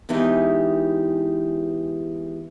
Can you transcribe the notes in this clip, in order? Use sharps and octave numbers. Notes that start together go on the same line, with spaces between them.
E2 E3 G#3 D#4 G4